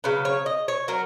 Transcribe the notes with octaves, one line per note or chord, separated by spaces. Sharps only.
C#3 F#3 B4
C#5
D#5
C#5
F#3 A#4